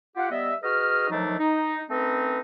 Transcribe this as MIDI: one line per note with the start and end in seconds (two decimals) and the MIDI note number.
0.17 0.31 65
0.17 0.31 67
0.17 0.31 78
0.31 0.54 55
0.31 0.54 59
0.31 0.54 75
0.31 0.54 76
0.63 1.10 66
0.63 1.10 68
0.63 1.10 71
0.63 1.10 75
0.63 1.10 89
1.11 1.38 51
1.11 1.38 53
1.11 1.38 54
1.11 1.38 57
1.11 1.38 62
1.11 1.38 63
1.39 1.81 63
1.90 2.40 57
1.90 2.40 60
1.90 2.40 61
1.90 2.40 63
1.90 2.40 70
1.90 2.40 71